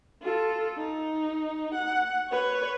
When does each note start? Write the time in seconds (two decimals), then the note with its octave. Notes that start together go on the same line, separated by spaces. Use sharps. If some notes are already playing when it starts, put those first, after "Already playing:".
0.22 F4 A4
0.77 D#4
1.74 F#5
2.30 B4 C#5